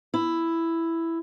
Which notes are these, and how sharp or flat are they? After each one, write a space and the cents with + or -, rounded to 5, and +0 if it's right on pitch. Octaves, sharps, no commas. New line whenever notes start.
E4 +5